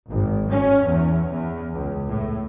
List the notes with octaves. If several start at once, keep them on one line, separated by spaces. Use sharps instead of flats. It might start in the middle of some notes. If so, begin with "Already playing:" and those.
G#1
C#4
E2
E2
C#2
A2